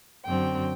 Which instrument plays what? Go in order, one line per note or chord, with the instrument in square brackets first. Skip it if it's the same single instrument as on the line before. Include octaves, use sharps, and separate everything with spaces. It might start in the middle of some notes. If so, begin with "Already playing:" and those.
[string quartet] F#2 D3 F#3 C4 G5